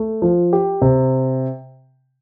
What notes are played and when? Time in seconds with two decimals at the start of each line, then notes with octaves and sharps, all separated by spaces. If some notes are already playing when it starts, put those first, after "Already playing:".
Already playing: A3
0.22 F3
0.53 G4
0.82 C3